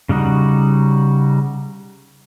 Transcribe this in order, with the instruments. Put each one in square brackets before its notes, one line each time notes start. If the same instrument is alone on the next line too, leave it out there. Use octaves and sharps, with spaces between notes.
[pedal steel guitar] C#3 G3 D#4 F#4